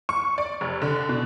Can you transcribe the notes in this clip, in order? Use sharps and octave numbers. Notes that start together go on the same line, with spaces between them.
C#6
D5
F1
D3
B2